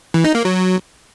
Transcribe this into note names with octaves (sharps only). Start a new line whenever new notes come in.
E3
D#4
A#3
F#3